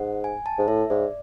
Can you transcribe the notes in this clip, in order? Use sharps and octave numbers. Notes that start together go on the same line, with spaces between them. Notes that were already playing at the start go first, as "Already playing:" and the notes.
Already playing: G#2 F#5
G#5
A5
G#2
A2 E5
G#2 D5